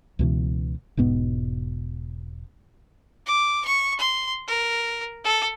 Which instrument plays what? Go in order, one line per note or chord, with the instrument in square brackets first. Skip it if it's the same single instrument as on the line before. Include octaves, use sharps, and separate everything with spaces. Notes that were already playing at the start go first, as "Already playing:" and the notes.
[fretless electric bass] C#2 B2 E3
E1 G#2 B2 B3
[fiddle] D6
C#6
C6
A#4
A4